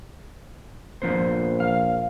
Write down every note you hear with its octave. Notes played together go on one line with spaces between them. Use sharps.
A#1 F3 B3 C5
F5